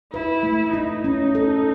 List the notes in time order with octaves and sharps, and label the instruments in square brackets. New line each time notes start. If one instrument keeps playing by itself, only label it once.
[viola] E4 [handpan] B4
[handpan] A3
[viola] D#4 [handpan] E4
[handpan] C#4
A4